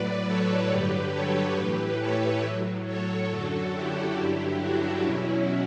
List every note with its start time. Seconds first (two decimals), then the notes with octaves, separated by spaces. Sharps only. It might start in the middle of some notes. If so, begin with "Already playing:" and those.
Already playing: A2 F#3 B4 D5
0.25 A4 C#5
0.68 G2 D3 F#3 G4 B4
1.12 A4 C#5
1.56 A2 E3 G4 B4
1.99 A4 C#5
2.42 A2 F#3
2.86 A4 C#5
3.30 F#2 D3 F#3 F#4 A4
3.73 E4 G4
4.17 G2 D3 F#3
4.60 D4 F#4
5.03 E2 B2 F#3 C#4 E4